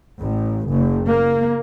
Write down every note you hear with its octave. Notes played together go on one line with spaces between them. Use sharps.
A1
F#1
A#3